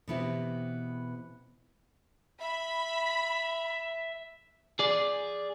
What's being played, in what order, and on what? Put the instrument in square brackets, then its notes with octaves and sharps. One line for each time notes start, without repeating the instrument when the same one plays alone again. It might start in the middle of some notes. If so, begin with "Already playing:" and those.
[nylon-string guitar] B2 E3 B3 C4 E4 G4
[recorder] E5 [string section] B5
[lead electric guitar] G#4 D5